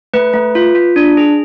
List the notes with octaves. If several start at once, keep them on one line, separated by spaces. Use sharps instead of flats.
A3 B4
A3
F4
F4
D4
G#4